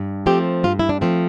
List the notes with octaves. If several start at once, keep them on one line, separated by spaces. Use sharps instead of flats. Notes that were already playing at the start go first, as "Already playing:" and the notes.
Already playing: G2
F3 A3 C4 G4
G2 F4
E4
D4
F3 A3 C4